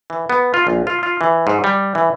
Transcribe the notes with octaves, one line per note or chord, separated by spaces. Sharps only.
E3
B3
F4
A#1
F4
F4
E3
G#2
G3
E3